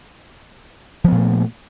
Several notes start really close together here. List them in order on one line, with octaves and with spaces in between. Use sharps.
F3 B3 A#2 A3